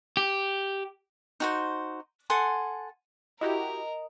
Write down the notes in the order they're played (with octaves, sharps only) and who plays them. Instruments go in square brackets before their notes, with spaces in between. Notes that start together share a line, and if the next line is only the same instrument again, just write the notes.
[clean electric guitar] G4
[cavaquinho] D#4 F#4 C5
A4 F#5 G#5 C6
[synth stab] E4 F#4 G4 [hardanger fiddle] A#4 [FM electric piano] D#5